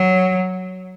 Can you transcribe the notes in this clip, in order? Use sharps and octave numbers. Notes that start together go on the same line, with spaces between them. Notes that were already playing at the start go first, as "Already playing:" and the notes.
Already playing: F#3